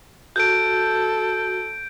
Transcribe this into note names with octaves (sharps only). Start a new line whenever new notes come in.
F#4 A4 G6 D7